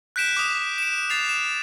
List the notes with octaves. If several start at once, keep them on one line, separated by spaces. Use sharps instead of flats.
F#6 G6 B6 D7 E7
D6 D#6
D7 E7
A6 C7 F7
E7